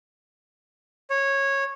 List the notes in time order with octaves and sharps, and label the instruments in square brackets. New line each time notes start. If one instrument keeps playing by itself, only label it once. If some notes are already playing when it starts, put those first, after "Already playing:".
[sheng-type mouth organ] C#5